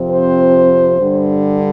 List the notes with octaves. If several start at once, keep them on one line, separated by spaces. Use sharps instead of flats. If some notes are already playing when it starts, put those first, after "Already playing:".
Already playing: F2 C3 F3 C4
C5
G2 D3 G3